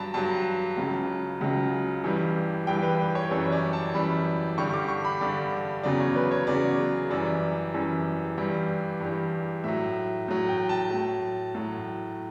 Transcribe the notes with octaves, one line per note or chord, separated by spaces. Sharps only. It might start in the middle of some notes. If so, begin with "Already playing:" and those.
Already playing: G2 F#3 A5 B5
G2 F#3 A5
C#2 C#3 F#3
C#2 C#3 F#3
G2 E3 G3
G2 E3 G3 G5
B4
B4
C#5
F#2 E3 G3
C#5
D5
A5
F#2 E3 G3 B5
G2 D3 G3 C#6
D6
C#6
B5
G2 D3 G3 D5
E2 C#3 F#3 D5
C#5
B4
C#5
E2 C#3 F#3 D5
F#2 E3 G3 D5
F#2 E3 G3
G2 E3 G3
G2 E3 G3
A2 F#3 E5
A2 F#3
G5
A5
A2 F#3
A2 F#3